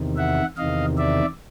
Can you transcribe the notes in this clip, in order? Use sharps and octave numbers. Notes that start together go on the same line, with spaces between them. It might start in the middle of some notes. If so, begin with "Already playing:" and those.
Already playing: E2 C3 D#3
E5 F#5
E2 C3 D#3 D#5 F5
D5 E5